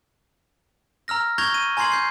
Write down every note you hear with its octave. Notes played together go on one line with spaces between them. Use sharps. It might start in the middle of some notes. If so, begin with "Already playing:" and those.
A#5 E6 F6 A#6
C#6 G6 G#6 A#6 F7 G7
D#7
G#5 A#5 C6 G#6 C7 F#7
G6 C7